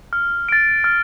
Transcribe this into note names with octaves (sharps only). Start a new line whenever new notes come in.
F6
A6 D7
F6